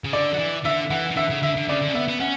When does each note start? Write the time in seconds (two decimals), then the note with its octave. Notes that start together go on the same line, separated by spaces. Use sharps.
0.04 C#3
0.13 D3 D5
0.33 F#3
0.39 E3
0.64 D3 E5
0.90 E3 F#5
1.11 E3
1.16 D3 E5
1.30 C#3
1.42 D3 E5
1.56 D3
1.68 C#3 D5
1.82 D3
1.88 C#4
1.95 B3 E5
2.08 B3
2.20 C#4 F#5